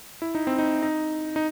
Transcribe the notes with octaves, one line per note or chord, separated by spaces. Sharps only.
E4
D#4
C4
D#4
D#4
D#4